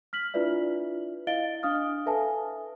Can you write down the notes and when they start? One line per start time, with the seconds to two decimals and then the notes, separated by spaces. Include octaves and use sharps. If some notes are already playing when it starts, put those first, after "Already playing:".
0.13 F6 B6 F#7
0.34 D4 E4 F4 B4 D5 E5
1.27 E4 D#5 F5 A6 D7 G7
1.63 D4 F5 D#6 F6
2.06 A4 B4 E5 G#5 A5